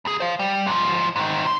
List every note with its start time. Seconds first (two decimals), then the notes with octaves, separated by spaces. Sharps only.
0.05 D#2 G#4
0.20 C5 F5
0.39 G3
0.66 G#2 F3
1.16 G#2 D#3
1.44 C3 C6